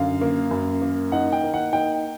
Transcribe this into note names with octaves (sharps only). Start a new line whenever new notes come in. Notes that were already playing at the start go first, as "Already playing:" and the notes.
Already playing: F#2 D3 F5
A#3
F#2
A#3
D#4 F#5
G5
A#3
F#5
D#4 G5